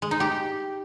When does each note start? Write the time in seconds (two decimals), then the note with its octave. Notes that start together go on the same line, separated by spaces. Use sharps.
0.02 G#3
0.11 D#4
0.20 G4